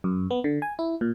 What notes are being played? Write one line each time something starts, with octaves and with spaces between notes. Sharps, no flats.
F#2
B3
D3
G#5
E4
A#2